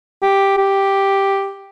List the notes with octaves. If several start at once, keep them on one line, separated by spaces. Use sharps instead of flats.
G4
G4